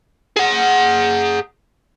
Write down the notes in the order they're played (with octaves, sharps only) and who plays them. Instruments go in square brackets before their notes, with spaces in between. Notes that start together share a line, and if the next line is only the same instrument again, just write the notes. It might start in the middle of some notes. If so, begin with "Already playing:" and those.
[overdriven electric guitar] G#4 F#5